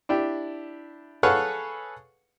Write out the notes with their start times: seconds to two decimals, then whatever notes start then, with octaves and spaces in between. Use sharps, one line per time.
0.09 D4 E4 G4 G5
1.23 G#4 A4 B4 C#5 F5 F#5